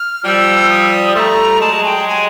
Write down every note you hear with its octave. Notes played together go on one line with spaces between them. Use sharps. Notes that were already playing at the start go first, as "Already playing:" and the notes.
Already playing: F6
F3 G3 E6 F6
D#6
G3 A3 A#5 C6
F#3 G#3 A5
G#5
G5
G#5